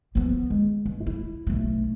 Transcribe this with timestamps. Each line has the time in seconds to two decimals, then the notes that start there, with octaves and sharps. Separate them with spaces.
0.15 F3 B3
0.50 G#3
0.85 G2
1.06 E4
1.47 B1 A3